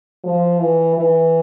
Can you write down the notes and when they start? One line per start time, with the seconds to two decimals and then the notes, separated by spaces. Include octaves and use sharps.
0.24 F3
0.60 E3
0.96 E3